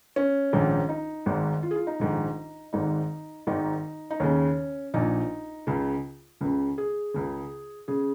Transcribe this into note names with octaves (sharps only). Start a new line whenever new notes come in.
C#4
A#1 G#2 D#3
D#4
G#1 G#2 D#3
F4
G#4
F4
D#4
A#1 G#2 D#3
G#1 G#2 D#3 D#4
G#1 G#2 D#3 D#4
D#4
D#2 C#3 C#4
A#1 A#2 D#4
C#2 C#3
C#2 C#3
G#4
C#2 C#3
C#3 G#4